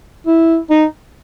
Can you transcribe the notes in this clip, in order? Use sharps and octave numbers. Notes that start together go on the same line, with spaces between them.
E4
D#4